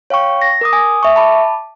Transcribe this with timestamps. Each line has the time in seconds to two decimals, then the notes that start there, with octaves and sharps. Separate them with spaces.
0.10 C#5 F5 G5 C#6
0.42 A#6
0.61 A#4 D6 D#6
0.73 G#5 D#6
1.03 E5 C#6
1.16 A5 B5 D6